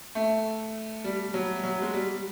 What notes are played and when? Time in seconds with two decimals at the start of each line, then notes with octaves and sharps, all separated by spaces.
0.15 A3
1.04 G3
1.34 F#3
1.64 F#3
1.82 G#3
1.93 G3